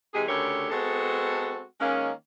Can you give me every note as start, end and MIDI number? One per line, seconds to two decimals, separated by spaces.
0.14 0.27 48
0.14 0.27 52
0.14 0.27 56
0.14 0.27 67
0.14 0.27 68
0.28 0.68 38
0.28 0.68 49
0.28 0.68 67
0.28 0.68 69
0.28 0.68 70
0.28 0.68 73
0.71 1.63 56
0.71 1.63 59
0.71 1.63 60
0.71 1.63 66
0.71 1.63 69
1.80 2.11 51
1.80 2.11 56
1.80 2.11 58
1.80 2.11 61